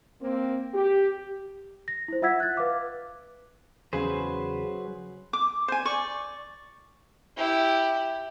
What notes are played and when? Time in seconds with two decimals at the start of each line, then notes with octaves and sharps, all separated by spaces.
0.21 A#3 C4
0.74 G4
1.88 A#6
2.08 E4 C5
2.22 F4 E5 F#5 E6 G#6 B6
2.40 F#6 A6
2.57 B4 F5 D6
3.93 E2 C#3 F#3 G#4 B4 C5
5.33 D6
5.68 C5 G#5
5.85 D5 C#6
7.37 E4 G4